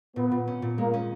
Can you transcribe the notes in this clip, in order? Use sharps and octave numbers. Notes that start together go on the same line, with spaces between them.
A#2 B3
A#2
C#4
A#2
G#3 A#3
C#4